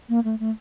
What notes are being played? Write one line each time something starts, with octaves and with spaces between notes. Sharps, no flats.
A#3
A3
A3